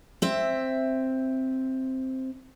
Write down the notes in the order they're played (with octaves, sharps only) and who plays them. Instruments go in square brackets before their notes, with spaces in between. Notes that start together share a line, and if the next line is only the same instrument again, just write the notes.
[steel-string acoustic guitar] C4 E5